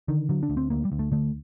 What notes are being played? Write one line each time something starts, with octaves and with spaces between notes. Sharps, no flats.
D3 D#3
D3 F#3
D4
D2
C4
D2 A#3
G3
D2
A3
D3 A3